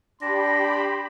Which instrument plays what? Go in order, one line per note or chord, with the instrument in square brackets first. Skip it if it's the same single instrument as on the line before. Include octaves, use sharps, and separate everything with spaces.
[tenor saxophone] D4 [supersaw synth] G4 B5 [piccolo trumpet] C6 [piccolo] A#6